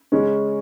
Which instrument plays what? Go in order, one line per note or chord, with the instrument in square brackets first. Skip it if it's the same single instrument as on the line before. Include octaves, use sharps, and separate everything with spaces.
[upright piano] C#3 G#3 C#4